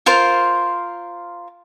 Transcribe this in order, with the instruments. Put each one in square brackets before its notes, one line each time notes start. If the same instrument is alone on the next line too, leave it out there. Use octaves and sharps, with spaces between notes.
[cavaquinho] F4 A#4 C5